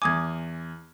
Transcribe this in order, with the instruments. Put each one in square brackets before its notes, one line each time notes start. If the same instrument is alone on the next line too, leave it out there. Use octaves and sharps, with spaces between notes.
[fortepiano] E2 G#5 [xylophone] D6 D#6 G#6